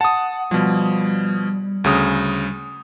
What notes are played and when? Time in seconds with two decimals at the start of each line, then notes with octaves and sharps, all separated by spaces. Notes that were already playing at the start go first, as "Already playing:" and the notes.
0.01 F#5 A5 D#6
0.51 B2 F3 G3
1.84 D2 C#3 D#6